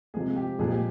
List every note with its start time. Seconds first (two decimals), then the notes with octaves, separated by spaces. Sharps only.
0.14 C3 F3 G#3 G#4
0.36 G4
0.59 A#2 F3 G#3 G#4
0.71 G4